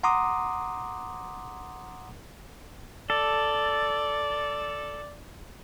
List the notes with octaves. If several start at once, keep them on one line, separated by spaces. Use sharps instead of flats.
F#5 A#5 C6 D6 D#6
A4 D5